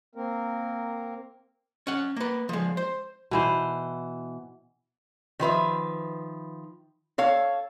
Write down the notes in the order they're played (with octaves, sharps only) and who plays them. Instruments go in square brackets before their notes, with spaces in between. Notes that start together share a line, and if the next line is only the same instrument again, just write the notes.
[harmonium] A#3 C4 A#4
[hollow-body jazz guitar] C#4 F#5
A#3 B4
F3 G#3
C5
[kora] B2 E3 C5
[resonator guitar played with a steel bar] D#3 F3 B4 E5
A4 C#5 F5